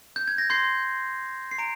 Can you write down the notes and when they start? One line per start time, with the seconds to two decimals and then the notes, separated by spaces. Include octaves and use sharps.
0.16 G6
0.28 G#6
0.38 A#6
0.50 C6 G6 C7
1.51 C7
1.58 A#5 D7